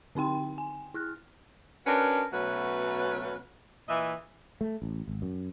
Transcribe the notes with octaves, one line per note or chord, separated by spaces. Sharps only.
D3 C4 D#4 G5 C6
G#5
E4 F6 F#6
C#4 D4 F#4 A#4 B4
B2 F#3 A3 C#4 F#4 B4
A#2 E3 D#5 E5
A3
A1
G#1
F#2